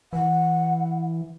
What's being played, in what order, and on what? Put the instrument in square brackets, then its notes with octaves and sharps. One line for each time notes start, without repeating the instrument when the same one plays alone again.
[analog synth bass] E3 [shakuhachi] F#5